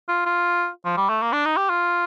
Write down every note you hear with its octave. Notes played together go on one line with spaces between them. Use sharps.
F4
F4
F3
G3
A3
A#3
D4
D#4
G4
F4